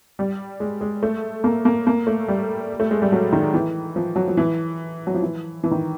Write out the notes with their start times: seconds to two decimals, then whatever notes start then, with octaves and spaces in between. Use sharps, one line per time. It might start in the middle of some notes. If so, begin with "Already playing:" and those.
0.19 G3
0.60 G#3
0.81 G#3
1.03 A3
1.44 A#3
1.65 A#3
1.87 A#3
2.07 A3
2.28 G3
2.80 A3
2.91 G#3
3.02 G3
3.12 F#3
3.33 D#3
3.54 E3
3.96 F3
4.16 F#3
4.28 F3
4.37 E3
5.07 F#3
5.15 F3
5.22 E3
5.64 E3
5.71 D#3